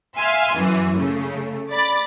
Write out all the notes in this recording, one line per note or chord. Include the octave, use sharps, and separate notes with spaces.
E5 F5 G#5 C6
F#2 E3
C#3 A3
D5 B5 A6